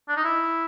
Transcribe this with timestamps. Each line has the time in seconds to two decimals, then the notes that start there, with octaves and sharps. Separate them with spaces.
0.08 D4
0.17 D#4
0.24 E4